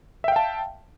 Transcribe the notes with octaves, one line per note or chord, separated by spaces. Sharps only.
E5 F5 G5 A5